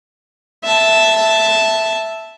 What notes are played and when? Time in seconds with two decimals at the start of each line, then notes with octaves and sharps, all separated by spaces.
0.64 E5 A5